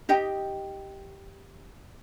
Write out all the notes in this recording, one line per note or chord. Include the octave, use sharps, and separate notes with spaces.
D#4 G4 D#5 G5